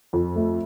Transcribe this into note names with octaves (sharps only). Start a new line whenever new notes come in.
F2
A3